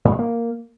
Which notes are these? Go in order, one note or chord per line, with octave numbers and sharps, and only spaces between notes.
G#2
G#3
A#3